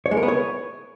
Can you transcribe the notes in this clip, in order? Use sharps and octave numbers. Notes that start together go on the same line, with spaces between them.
C#5
G#3
A#4
B3
C#5